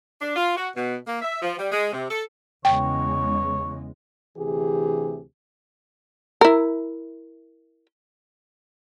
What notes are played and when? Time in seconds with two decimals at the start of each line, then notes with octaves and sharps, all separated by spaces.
0.20 D4
0.36 F4
0.56 F#4
0.75 B2
1.07 A#3
1.21 E5
1.42 F3
1.59 G3
1.72 G#3
1.92 C3
2.10 A4
2.65 E2 C#3 G#3 C#5 G5
4.37 D2 C3 E3 G4 G#4
6.41 E4 A#4